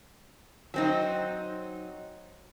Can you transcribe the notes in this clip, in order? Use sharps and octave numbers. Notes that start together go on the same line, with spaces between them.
F#3 C4 D#4